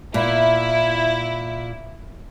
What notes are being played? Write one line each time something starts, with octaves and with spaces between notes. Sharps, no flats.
A#2 E4